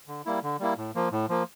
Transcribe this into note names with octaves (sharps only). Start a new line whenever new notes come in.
D3
G3 A#3 E4
D3
G3 A#3 E4
A2
F3 A#3
A2
F3 A#3